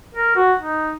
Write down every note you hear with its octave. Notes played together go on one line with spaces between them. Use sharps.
A#4
F#4
D#4